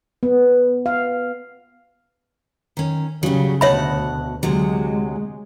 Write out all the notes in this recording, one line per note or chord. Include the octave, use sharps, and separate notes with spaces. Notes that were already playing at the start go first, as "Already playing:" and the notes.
B3
F5
D#3 C#4
C#3 F#3 G3
D2 B2 C#5 E5 F#5 A5 B5
D2 C3 F#3 G#3